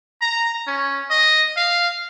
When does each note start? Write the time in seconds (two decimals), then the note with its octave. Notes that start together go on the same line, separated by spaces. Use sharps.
0.21 A#5
0.67 C#4
1.10 D#5
1.57 F5